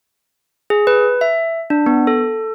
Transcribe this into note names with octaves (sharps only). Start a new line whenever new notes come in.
G#4
B4
E5
D4
B3
A4